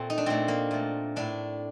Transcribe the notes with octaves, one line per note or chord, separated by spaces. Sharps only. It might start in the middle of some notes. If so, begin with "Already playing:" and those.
Already playing: A#2 A3 C4
D#4
D4
A#2 A3 C4
A#3
A#2 A3
A2 A3 D4